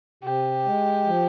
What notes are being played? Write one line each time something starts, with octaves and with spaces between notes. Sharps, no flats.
C3 G4
G#3
F3